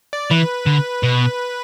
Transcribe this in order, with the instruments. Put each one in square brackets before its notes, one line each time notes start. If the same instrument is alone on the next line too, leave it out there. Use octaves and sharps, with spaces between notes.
[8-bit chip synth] D5
[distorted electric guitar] E3 [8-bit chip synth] B4
[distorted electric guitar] D3
B2